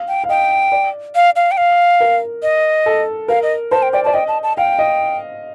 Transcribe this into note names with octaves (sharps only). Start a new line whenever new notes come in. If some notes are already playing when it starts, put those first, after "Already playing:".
Already playing: F5
G5
F5
D#5 G5
D5
F5
F5
G5
F5
A#4
D#5
A4
A#4 F5
D#5
C5 A5
G5
D5 G5
D5 A5
D#5 G5
A5
A5
F5 G5
D#5